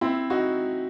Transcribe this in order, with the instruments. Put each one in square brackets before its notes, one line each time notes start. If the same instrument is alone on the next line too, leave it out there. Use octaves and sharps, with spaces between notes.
[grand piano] C4 E4
D#4 F#4